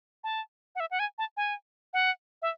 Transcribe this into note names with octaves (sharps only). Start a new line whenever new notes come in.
A5
F#5
E5
F#5
G#5
A5
G#5
F#5
E5